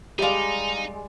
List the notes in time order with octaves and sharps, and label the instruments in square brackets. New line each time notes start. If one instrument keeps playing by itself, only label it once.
[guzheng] G3 G#3 [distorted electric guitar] D#4 [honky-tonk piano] G4 D5 F5